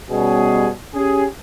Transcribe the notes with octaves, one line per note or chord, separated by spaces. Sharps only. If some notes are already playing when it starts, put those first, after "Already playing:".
B2 G3 C#4 G#4
C#4 G4 G#4